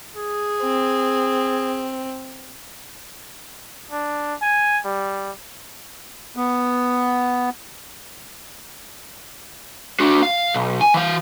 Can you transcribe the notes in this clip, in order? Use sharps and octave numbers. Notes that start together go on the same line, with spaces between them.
G#4
C4
D4
G#5
G3
B3
D4 F#4
F5
B1
G#5
E3 F5